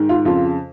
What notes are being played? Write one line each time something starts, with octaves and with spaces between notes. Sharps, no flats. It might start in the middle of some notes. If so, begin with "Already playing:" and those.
Already playing: G#2 D#3
F4
F2 C#3 F4